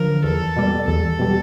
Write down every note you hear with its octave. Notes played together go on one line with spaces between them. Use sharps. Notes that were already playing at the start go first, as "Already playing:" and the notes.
Already playing: D3 F3 A#4
E2 A4
B2 G3
E2 A4
B2 G3